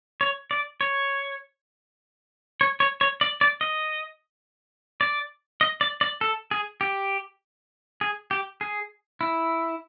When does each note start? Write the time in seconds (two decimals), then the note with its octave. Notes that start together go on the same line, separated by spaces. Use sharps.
0.21 C#5
0.51 D5
0.81 C#5
2.61 C#5
2.80 C#5
3.01 C#5
3.21 D5
3.41 D5
3.61 D#5
5.01 D5
5.61 D#5
5.81 D5
6.01 D5
6.21 A4
6.51 G#4
6.81 G4
8.01 G#4
8.31 G4
8.61 G#4
9.21 E4